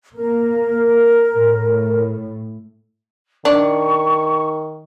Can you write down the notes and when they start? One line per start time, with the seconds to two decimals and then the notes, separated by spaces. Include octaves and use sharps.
0.15 A#3 A#4
1.33 A2
3.45 D#3 D4 C#6